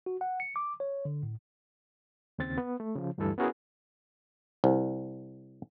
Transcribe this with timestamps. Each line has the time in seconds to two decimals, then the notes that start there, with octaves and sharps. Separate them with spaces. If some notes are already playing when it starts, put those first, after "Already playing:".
0.06 F#4
0.21 F#5
0.40 C#7
0.56 D6
0.80 C#5
1.05 D3
1.23 A2
2.39 D#2 C#3 C4 A6
2.58 B3
2.80 A3
2.96 C#3 F3
3.18 D2 G2 E3 G3 E4 A4
3.38 B3 C#4 E4 F#4 G#4 A#4
4.64 C2